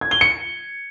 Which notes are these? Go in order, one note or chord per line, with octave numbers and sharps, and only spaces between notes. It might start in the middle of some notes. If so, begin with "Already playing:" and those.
G#6
G7
C#7